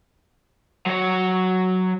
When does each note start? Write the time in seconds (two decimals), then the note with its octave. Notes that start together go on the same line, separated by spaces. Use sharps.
0.87 F#3 C#5